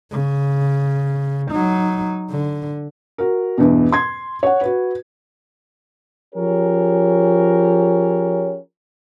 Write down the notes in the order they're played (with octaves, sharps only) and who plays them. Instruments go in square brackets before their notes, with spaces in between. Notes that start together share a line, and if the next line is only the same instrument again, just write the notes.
[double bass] C#3
F#3 D#4
D3
[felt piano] F#4 A#4
E2 G2 B2
C6 G#6
C#5 F#5
F#4 B4
[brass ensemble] F3 C#4 G4 G#4 A#4 C#5